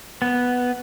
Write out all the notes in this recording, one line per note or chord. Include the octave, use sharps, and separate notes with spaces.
B3